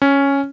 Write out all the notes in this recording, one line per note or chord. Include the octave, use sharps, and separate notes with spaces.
C#4